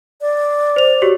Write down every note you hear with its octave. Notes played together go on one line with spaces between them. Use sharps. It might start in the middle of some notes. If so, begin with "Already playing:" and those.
D5
C5 F7
F#4 G4 C#5